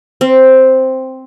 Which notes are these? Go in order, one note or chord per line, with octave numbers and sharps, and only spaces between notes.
C4